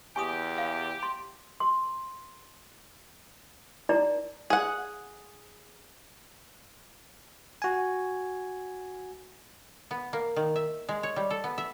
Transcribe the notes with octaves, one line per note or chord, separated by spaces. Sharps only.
E2 G4 G#5 C#6 D#6
F5
C6
C6
D#4 E4 D5 A#5
G#4 F#5
F#4 G#5
B3
A#3
D#3
E5
G#3
C#5
G3
A4
B3
E5